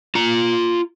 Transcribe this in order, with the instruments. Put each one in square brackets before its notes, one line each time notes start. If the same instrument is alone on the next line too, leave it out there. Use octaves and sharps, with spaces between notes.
[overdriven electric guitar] F4 A#5